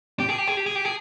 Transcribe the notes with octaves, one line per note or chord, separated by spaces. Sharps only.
G4
G#4
G4
G#4
G4
G#4
G4
G#4